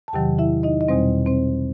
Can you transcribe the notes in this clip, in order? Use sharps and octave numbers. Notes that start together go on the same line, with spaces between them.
A5
E2 C3 D#3 F#3 G4 G5
E4 E5
D#4 D#5
D#5
E2 B2 G3 C4 C5
C4 C5